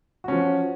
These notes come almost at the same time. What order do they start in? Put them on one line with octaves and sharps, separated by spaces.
F#4 C#4 F3